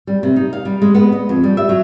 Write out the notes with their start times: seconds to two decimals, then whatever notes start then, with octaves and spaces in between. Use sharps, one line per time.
0.07 G3
0.23 C3
0.36 D#4
0.53 F5
0.65 G3
0.82 G#3
0.95 B3
1.12 D#5
1.29 F2
1.44 G3
1.57 E5
1.69 F#3